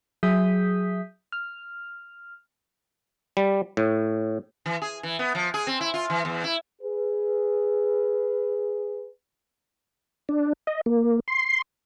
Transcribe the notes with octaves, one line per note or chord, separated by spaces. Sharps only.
F#3 G#4 E5 D#6 G6 B6
F6
G3
A2
E3
G#4
E3
B3
F3
G#4
C4
E4
F4
E3
E2
E4
G#4 B4
D4
D#5
A#3
C6